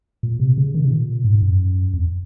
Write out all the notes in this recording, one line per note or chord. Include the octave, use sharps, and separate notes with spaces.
A#2
C3
C#3
D#3
C3
A#2
G#2
F#2
F2